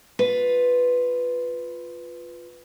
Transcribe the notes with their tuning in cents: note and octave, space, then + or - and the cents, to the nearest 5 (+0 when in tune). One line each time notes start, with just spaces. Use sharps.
F4 +5 B4 +5